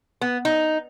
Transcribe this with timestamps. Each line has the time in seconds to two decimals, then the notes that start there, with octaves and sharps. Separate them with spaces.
0.21 B3
0.45 D#4